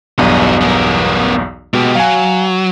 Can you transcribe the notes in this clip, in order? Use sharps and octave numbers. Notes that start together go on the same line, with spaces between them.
B1 E2 G2 F#3 D#5
B3 A#4
B2 G#3 G4
F#3 F5 G#5